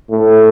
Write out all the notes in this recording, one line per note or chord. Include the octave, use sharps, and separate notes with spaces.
A2